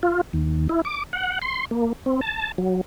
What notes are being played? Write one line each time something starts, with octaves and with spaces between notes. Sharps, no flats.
F4
D#2
E4
D6
F#5
C6
A#3
C4
A5
F#3